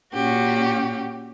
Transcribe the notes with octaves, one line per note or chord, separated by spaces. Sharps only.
A#2 C#4 F#4 G4